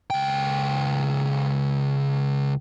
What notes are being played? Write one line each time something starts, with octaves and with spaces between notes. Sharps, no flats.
C#2 G5